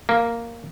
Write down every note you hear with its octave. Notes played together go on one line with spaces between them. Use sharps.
A#3